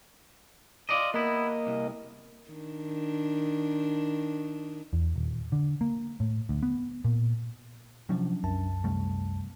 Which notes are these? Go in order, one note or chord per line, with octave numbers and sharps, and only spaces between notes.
F4 D5 D#5
A#3 B3 E4 D#5
C2
D#3 D4
E2
D#1
D3
A#3
A2
D2
B3
A#2
C3 F3 F#3 C#4 D4
C2 F#2 A5
C3 G3 A3